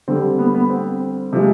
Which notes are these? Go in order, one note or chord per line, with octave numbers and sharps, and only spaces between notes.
D3 G3 C4
B3
B3
C4
C3 F3 G#3